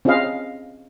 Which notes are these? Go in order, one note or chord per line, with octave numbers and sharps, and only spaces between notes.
C4 C#4 F4 G#4 D#5 F5